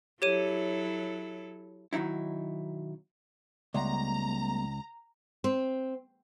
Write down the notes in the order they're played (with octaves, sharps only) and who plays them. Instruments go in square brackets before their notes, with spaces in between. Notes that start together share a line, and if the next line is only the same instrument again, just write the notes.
[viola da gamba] F#3 E4 A4 [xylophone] G4 C#5 D#7
[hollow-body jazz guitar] B1 D#3 F#3 D#4 E4
[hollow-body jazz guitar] C#2 [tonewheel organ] G3 A3 B3 [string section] A#5
[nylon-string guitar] C4